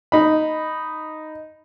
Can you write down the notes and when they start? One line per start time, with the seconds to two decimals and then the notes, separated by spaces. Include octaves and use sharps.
0.12 D#4 B5